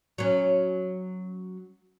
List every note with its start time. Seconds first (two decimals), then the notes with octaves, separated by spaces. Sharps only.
0.18 F#3 C#4